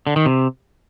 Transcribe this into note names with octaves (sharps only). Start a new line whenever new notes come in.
D3
D#3
C3